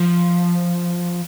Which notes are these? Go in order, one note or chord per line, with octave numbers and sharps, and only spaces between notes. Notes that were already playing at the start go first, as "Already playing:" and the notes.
Already playing: F3